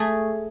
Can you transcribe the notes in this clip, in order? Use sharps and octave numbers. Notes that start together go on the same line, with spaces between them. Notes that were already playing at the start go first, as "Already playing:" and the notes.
Already playing: A3 G#4